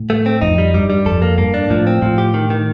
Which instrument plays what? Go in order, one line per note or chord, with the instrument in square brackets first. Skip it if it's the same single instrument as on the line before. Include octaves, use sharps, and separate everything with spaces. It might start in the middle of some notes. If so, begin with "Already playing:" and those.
Already playing: [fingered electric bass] A2
[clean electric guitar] A3
C4
[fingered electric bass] F2 [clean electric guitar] D#4
[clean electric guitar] G3
[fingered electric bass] G2 [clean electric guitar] G3
[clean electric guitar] G3
[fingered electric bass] F2 [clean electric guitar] A4
[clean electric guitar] A#3
[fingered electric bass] G2 [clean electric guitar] A#3
[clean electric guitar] D4
[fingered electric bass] A2 [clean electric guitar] F3
[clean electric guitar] C4
[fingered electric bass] A2 [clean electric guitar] F3
[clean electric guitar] G4
D#3
D#3